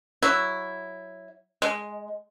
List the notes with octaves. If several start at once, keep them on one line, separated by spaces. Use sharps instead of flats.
F#3 E4
G#3